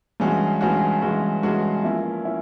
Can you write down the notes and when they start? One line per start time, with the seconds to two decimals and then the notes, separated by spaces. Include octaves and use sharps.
0.20 G2 E3 G#3 C#4 F#4
0.61 G2 E3 G#3 C#4 F#4
1.02 G2 E3 G#3 C#4 F#4
1.43 G2 E3 G#3 C#4 F#4
1.84 F3 A#3 C#4 E4
2.25 C#4 E4